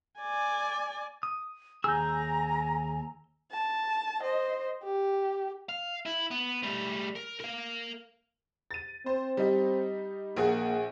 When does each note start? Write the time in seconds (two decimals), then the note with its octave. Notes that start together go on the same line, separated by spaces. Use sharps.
0.20 D5 G#5
1.23 D#6
1.84 D#2 G#4 G#5 A#5 E6 G6
3.51 A5
4.21 C5 D#5
4.84 G4
5.69 F5
6.06 E4
6.31 B3
6.63 G3 A3
7.15 A#4
7.40 A#4 F5
8.71 A6 D#7
9.06 C4 C5
9.37 G3 D#4
10.37 A#1 A#3 G#4 F#5